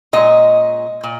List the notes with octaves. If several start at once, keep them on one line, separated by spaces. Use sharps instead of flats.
A#2 G#3 C#4 D#5
A#2